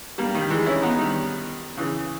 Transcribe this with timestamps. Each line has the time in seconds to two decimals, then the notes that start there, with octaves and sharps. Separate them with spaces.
0.18 G3 A#3
0.35 D#3 G3
0.50 E3 G#3
0.66 C#4 E4
0.82 B3 D#4
0.98 D#3 G3
1.77 C#3 E3